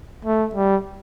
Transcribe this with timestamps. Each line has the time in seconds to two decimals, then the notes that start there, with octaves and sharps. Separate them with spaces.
0.25 A3
0.55 G3